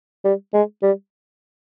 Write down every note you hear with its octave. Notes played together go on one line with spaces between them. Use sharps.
G3
G#3
G3